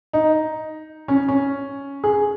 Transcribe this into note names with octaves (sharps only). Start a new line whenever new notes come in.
D#4
C#4
C#4
G#4